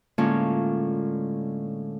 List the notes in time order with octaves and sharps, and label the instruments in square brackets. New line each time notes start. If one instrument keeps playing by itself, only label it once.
[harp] A2 D3 G#3 A#3 C#4 F4